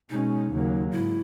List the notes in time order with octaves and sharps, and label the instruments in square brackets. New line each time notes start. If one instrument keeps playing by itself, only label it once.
[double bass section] B2 G#3 C#4 [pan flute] D#4
[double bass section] D#2 C#3 F#3 A#3
[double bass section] G#2 [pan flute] E4